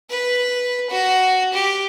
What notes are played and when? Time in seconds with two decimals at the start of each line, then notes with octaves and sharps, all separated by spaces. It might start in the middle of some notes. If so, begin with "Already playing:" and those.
0.10 B4
0.90 F#4
1.53 G4